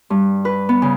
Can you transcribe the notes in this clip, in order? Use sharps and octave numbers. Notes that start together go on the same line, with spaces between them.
G2
B4
B3
C#3